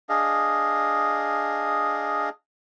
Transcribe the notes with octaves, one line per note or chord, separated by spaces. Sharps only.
D4 G#4 D#5 F5